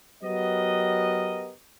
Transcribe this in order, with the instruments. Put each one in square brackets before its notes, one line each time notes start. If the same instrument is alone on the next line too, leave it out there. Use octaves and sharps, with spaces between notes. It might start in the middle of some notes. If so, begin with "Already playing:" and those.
[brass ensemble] F#3 B3 G4 A#4 D#5